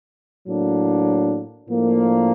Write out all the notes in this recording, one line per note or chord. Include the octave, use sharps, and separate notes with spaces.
A2 F#3 A#3 D4
A2 F3 A#3 D4